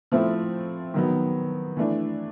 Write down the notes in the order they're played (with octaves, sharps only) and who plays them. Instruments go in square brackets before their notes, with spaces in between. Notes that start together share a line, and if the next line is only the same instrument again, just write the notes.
[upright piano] F3 A3 C4 E4
D#3 F#3 B3
E3 A3 D4